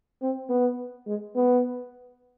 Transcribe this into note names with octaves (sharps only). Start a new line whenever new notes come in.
C4
B3
G#3
B3